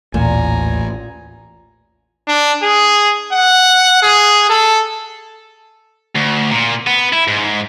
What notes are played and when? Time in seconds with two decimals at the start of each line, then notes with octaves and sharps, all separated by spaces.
0.14 A1 D#2 A#2 G#5 A#5
2.27 D4
2.63 G#4
3.33 F#5
4.02 G#4
4.50 A4
6.15 D2
6.51 A#2
6.87 B3
7.13 E4
7.28 G#2